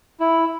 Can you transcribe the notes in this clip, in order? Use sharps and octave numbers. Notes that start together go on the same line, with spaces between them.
E4